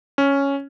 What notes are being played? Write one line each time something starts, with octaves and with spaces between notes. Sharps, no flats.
C#4